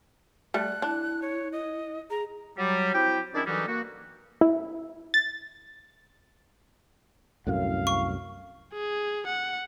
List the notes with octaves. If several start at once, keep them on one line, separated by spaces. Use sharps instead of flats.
G3 A3 F#6
D4 E4
C#5
D#5
G#4 A#5
F#3 G3
C4 E4 F#4 G4 G5
D#3 C#4 D4 E4 G#4 D5
D3 E3 F#3 G3 D#4 F#4
A#3 F#4
E4
A6
C2 F#2 A2 F5
C#6
G#4
F#5